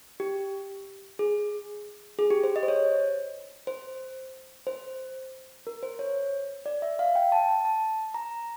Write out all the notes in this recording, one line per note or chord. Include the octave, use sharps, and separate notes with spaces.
G4
G#4
G#4
G4
C5
D#5
C5
C#5
C5
C5
A#4
C5
C#5
D5
E5
F5
G5
A5
A5
A5
A#5